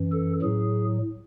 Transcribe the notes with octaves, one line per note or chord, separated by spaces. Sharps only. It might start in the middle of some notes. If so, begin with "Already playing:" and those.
Already playing: F#2 E3
A4
A2 F#3 G#4